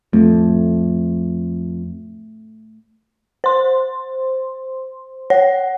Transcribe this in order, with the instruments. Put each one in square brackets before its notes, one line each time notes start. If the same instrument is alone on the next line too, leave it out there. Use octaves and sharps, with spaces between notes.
[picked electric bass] F2 [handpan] A3
[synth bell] C5 C6
[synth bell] C#5 [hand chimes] F#5